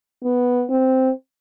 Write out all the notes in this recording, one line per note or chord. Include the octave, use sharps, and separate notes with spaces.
B3
C4